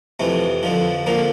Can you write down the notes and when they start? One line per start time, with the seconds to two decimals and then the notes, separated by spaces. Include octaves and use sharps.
0.20 F2 C3 E3 A3
0.63 F2 D3 F3
1.06 D3 F3 A#3